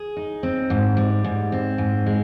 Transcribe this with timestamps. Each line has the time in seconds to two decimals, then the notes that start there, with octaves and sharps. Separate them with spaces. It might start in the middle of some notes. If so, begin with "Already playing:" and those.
Already playing: G#4
0.17 D#4
0.43 C4
0.70 G#2
0.97 G3
1.24 G#2
1.52 C4
1.78 G#2
2.06 G#3